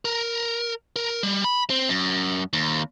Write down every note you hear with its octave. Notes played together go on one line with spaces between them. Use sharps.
A#4
A#4
G3
B5
C4
F#2
D#2